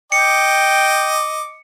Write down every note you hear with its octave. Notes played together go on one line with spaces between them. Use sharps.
D#5 G5 D6 C#7